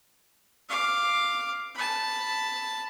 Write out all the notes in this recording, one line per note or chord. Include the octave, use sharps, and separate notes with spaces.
F5 D6
A5 B5